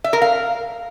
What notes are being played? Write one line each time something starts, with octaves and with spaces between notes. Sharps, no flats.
E5
A#4
F5